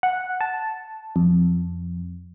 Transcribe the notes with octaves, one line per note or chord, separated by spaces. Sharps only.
F#5
A5
F2